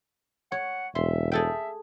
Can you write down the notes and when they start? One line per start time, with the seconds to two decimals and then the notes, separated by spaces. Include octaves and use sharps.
0.52 C#5 F#5
0.95 E1 E5 C6
1.32 G#4 A4 E5 G5